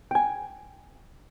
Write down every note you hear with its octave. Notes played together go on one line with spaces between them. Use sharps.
G5 G#5